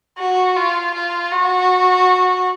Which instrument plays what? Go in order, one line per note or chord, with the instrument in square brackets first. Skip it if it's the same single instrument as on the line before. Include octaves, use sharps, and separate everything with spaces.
[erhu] F#4
F4
F4
F#4